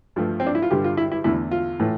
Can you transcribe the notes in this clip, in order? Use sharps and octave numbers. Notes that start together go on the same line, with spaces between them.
G2 F3 A3
C4
D4
E4
F4
G2 D3 G3 G4
F4
E4
E4
E2 D3 A3 E4
F4
A2 E3 A3